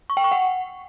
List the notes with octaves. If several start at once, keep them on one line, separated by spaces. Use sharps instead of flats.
C#6
G5
C#6
F#5